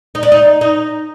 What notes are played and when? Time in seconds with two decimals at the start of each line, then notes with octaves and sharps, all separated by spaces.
0.15 D#4
0.23 D4
0.32 D#4
0.61 D#4